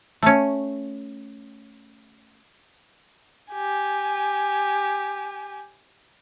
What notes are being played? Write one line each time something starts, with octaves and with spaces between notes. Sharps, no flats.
A3 C#4
G4 G#5